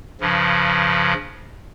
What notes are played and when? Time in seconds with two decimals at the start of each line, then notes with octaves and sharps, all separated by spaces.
0.21 G2 C#3 F3